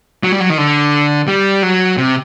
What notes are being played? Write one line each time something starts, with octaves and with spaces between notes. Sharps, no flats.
F#3
G3
F#3
D#3
D3
G3
F#3
C3